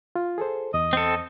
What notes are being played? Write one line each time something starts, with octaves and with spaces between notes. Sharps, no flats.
F4
G#4 A4 C5
E2 D#5
C4 A4